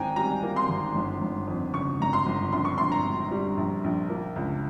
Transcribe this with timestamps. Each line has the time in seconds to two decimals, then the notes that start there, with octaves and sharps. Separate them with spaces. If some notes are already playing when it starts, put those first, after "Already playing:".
Already playing: G#1 G#2 G5 G#5 A#5
0.16 G3 A#5
0.43 A#3
0.56 C6
0.69 G#1
0.95 G1
1.21 G1
1.47 F2
1.74 C#3 C#6
2.00 G1 A#5
2.13 C6
2.26 G1
2.52 A#1 C6
2.65 C#6
2.78 A#1 C6
2.92 A#5
3.05 G#2
3.31 G3
3.57 A#1
3.84 A#1
4.10 A#3
4.36 C#2